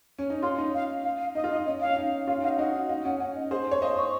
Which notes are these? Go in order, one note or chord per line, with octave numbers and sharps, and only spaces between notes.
C#4
D#4
C#4 F4 C6
D#4
F5
F5
F5
D#4 D#5
F4
D#4 D#5
C#4 D#5
C#4 F5
D#4
C#4 F4 F5
D#4 F#4 F5
D#4 F#4 D#5
D#5
D#4 F5
C#4 F#5
C#4 F#5
D#5
G#4 C5
C#5
C5 D#5 F5
C#6